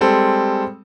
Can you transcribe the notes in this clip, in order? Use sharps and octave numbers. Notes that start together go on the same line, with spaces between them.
G3 G#3 C4 A4